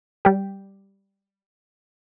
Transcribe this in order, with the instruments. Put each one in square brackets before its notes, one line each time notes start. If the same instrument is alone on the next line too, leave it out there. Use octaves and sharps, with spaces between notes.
[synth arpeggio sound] G3 G4